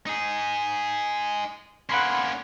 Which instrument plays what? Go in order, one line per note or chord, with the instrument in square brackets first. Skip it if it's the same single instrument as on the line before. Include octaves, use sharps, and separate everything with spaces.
[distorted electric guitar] D#4 G#4
[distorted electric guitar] A#3 C#4 [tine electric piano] F#5 B5 C6